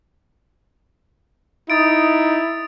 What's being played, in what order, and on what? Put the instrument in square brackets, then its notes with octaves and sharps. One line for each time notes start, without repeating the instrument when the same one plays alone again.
[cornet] D#4 [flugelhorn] E4 [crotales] D#6 A6 D7